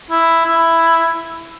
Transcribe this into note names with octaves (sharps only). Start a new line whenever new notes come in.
E4
E4